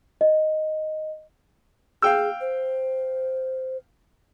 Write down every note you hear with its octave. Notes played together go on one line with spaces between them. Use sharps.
D#5
G#4 F5 G5 E6
C5